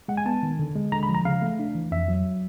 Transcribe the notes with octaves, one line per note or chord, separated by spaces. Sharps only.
G#3 F#5
G#5
B3 A5
D#3
D3
G#3
D3 A#5
B5
F3
A#5
C#3 F5
A3
D4
E3
F2 E5
F#3